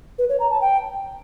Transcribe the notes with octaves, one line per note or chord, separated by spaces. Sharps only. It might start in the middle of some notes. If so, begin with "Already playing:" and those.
B4
C#5
A#5
A5
G5